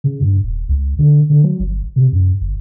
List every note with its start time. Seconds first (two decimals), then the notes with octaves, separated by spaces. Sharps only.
0.04 C#3
0.21 G2
0.43 D#1
0.69 C#2
0.99 D3
1.30 D3
1.43 F#3
1.60 G1
1.96 C3
2.12 F#2
2.41 G1